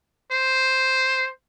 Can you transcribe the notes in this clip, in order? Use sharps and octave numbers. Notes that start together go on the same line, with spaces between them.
C5